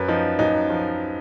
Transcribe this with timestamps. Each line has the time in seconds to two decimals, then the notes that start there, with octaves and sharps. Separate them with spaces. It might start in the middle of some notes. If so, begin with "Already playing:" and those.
Already playing: F#2 B4
0.08 F3 D#4
0.39 F#2 D#4
0.70 F3